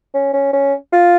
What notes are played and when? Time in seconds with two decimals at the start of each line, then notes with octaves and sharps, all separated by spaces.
0.14 C#4
0.34 C#4
0.53 C#4
0.93 F4